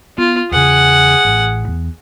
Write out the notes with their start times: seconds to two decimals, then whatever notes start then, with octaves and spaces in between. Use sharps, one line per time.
0.18 B3 F4
0.51 E2 C#3 G#4 F#5
1.25 A1 A2
1.68 E2